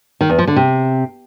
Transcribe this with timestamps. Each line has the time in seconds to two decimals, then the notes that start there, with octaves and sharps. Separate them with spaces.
0.21 D#3
0.30 E2
0.39 F3
0.47 D3
0.56 C3